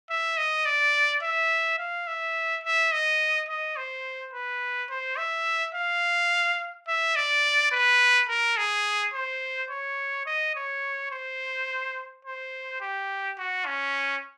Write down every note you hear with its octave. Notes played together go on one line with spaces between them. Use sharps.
E5
D#5
D5
E5
F5
E5
E5
D#5
D#5
C5
B4
C5
E5
F5
E5
D5
B4
A#4
G#4
C5
C#5
D#5
C#5
C5
C5
G4
F#4
C#4